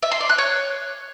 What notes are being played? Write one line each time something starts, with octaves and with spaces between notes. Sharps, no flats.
E5
C6
D5
F#6
C#5